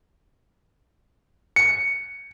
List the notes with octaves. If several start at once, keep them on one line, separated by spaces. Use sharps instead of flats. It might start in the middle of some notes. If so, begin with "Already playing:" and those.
C#7